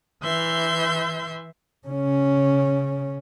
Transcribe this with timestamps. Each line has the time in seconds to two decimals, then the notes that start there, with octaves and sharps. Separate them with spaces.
0.23 E3 E5 C6 G6
1.87 C#3 C#4